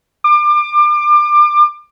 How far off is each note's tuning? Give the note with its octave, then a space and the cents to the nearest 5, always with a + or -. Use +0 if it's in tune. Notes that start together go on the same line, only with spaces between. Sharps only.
D6 +30